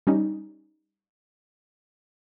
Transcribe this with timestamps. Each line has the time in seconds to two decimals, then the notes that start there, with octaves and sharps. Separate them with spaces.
0.07 G3 C#4 D#4